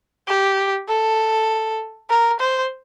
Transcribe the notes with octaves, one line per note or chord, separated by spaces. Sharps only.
G4
A4
A#4
C5